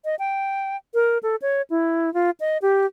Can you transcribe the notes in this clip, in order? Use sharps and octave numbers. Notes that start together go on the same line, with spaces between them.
D#5
G5
A#4
A4
C#5
E4
F4
D#5
G4